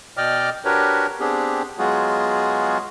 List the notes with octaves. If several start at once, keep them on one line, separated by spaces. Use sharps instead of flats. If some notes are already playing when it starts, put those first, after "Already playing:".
B2 D5 D#5 G5 D6 F6
D4 F#4 G4 A#4 B4 C#5
B3 C4 D4 G4 G#4
F#3 G#3 B3 F4 F#4 G#4